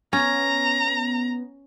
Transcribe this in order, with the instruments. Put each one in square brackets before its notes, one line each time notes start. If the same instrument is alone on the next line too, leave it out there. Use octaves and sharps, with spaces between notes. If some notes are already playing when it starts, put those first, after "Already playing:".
[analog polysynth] B3 [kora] C#4 [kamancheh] A#5